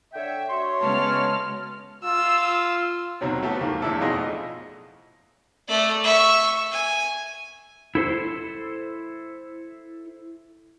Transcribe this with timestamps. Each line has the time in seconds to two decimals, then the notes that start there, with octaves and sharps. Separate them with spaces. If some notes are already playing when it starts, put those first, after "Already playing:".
0.14 D3 C#5 E5 G5
0.50 A3 F#4 C#5 C6
0.81 C#3 G#3 B3 A5 F6
2.04 F4 E6
3.21 D#2 B2 F#3 C4
3.43 A3 B3 F#4 G4 A4
3.61 D#2 A#3
3.82 E2 A2 A3 D4 E4 A4
4.01 F2 B2 D#4 F4 G#4 D#5
5.68 A3 D5
6.03 E5 C#6
6.71 G#5
7.95 E4 A4 C5